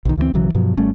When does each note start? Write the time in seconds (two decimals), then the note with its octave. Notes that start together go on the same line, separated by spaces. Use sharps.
0.05 B1 D#3
0.17 D2 E3 G3 C4
0.34 B1 C#3 E3 F#3
0.55 G2 B2 F3 F#3
0.77 G#1 G3 A3 C#4